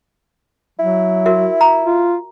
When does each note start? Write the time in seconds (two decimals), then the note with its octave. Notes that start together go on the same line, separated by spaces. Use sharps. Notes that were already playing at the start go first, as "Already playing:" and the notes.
0.79 F#3 E4
1.26 F#4 A#4 E5
1.61 A#5
1.85 F4